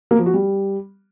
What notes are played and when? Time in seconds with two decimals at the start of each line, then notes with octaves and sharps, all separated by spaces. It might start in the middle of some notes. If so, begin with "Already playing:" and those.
0.11 A#3
0.18 F3
0.26 F#4
0.34 G3